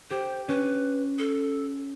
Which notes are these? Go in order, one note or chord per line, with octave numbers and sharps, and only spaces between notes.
G4 C5
C#4 B4
A4